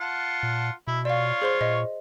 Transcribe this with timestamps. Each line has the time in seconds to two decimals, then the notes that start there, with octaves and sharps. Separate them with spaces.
0.01 F4 F#5 A5
0.43 A#2
0.87 B2 E4
1.05 F4 C#5 D5 F5
1.42 G#4 C5 C6
1.61 A#2 D#5